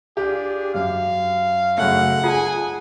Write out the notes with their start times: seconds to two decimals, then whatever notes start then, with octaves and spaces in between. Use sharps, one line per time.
0.17 D4 F4 G4 G#4
0.74 F#2 F5
1.78 F#2 C#3 A3 F#5
2.24 D#4 F4 G#4 G#5 A5